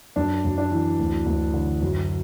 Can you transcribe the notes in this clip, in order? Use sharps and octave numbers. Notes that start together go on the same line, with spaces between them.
F#2 D4
F#2
D4
E3
D2
D2
D3
F#2